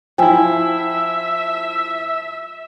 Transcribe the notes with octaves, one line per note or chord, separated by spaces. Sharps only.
F3 E4 E5 G5 G#5